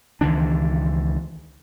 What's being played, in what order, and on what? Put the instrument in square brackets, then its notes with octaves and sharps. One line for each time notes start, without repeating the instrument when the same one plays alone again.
[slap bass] C#2 D#3 E3 D4